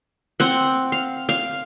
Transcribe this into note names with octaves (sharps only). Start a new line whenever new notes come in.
C4 F#5
F5
F5